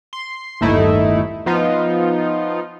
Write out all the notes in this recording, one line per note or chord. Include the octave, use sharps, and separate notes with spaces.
C6
G1 D#2 A2 A3 D#4 E4
F3 B3 D#4 F4